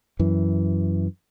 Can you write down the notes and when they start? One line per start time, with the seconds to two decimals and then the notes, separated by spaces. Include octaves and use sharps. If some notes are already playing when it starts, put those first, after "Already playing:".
0.19 F#2 E3